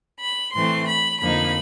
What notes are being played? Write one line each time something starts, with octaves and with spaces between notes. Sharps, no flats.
B5
A2 E3 A3 C4 C6
B5
F2 D3 F3 A#3 D#4 B5